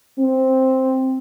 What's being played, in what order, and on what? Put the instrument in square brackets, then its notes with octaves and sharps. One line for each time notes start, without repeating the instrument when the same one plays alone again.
[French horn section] C4